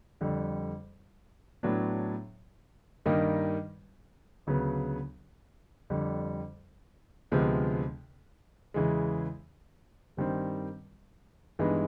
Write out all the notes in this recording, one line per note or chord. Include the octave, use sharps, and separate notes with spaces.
F2 D3 G3
A2 F#3 B3 D4
G2 D#3 G3 A#3 D#4
D2 C#3 F#3 B3
F2 D3 G3
D2 C3 F3 G#3 B3
E2 C#3 E3 G#3
G2 D#3 G3 C4
G2 E3 G#3 B3 D#4